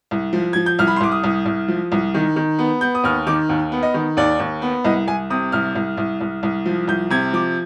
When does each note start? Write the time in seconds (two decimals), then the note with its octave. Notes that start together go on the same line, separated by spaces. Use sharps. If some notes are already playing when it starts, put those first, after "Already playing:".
0.11 C2
0.33 F3
0.53 F3 G#6
0.66 G6
0.79 C2 F6
0.87 B5
0.96 C6
1.01 C2 D6
1.12 D#6
1.24 C2
1.46 C2
1.68 F3
1.92 C2
2.14 D#3
2.36 D#3
2.59 B3
2.81 B3 G6
2.95 D#6
3.04 D#2 F6
3.27 D#3 D6
3.49 D#2
3.72 B3
3.83 D#5
3.94 D#3
4.17 D#2 D5
4.40 D#2
4.62 B3
4.84 C2 D#5
5.08 C2 G#5
5.30 C3 D#6
5.52 C2 F6
5.75 C2
5.97 C2
6.21 C2
6.43 C2
6.66 F3
6.88 C2 G6
7.10 C3 G#6
7.33 F3 D6